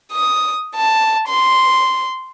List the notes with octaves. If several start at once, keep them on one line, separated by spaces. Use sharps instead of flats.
D#6
A5
C6